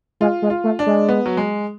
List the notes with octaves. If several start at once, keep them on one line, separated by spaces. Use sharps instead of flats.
G#3 F4
G#3
F4
A3
D4
G#3
B3
F#3
G#3